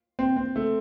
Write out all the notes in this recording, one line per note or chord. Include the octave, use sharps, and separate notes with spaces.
C4
C4
A3